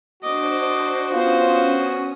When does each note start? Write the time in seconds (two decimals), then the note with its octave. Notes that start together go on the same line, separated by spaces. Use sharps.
0.23 D4 F#4 C5 D#5 D6
1.13 B3 C#4 F4 C5 D#6